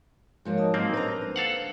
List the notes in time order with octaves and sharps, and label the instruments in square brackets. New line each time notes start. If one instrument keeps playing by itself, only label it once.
[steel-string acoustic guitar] G#2 F3 A#3 [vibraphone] F#4 A#4 C#5
[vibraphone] D#5 A5 D#6
[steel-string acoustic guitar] G#2 F3 F#3 [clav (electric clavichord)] A#3 C4
[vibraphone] D4 C5 [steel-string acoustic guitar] B4 A5 A#5
[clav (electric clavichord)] A4 F5 F#5